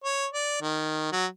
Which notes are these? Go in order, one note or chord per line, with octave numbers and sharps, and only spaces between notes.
C#5
D5
D#3
F#3